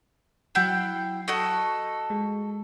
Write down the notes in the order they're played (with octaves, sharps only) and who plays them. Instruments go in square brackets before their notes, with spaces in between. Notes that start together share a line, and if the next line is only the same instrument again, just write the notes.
[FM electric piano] F#3 C7 [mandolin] E4 F#5 G5
[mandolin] F#4 A4 D#5 [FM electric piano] C#6
[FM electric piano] G#3